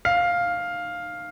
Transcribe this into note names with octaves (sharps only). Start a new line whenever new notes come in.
F5